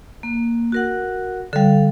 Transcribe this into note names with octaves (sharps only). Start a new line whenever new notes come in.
A#3
F#4 A#4 F#5
D3 G3 A4 F5